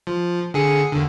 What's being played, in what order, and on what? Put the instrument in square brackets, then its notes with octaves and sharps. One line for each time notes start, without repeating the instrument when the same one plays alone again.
[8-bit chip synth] F3
D3 G#4 C#7
D#2 D3